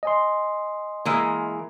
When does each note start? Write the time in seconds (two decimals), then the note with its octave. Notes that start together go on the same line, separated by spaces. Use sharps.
0.03 D#5 G#5 C6
1.05 E3 G#3 A#3